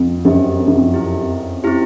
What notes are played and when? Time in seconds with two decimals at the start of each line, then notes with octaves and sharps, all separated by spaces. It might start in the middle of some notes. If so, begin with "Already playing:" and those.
Already playing: F2
0.24 F#2 G4 C5 D#5
0.60 F2
0.68 F#2
0.75 F2
0.94 C4 E4 G4
1.64 C4 E4 G4